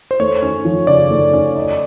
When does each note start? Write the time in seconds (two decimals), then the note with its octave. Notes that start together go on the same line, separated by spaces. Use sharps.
0.11 C5
0.20 A3 C#5
0.42 C#4
0.65 F3
0.87 C#3 D5
1.11 A3
1.33 C#4
1.56 D#4